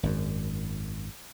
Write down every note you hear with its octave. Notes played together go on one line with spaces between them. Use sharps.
G#1 F#2